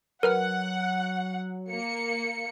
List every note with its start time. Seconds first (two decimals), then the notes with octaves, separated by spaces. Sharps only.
0.23 F#3 A#4 B4 F#5 F6
1.70 A#3 C#7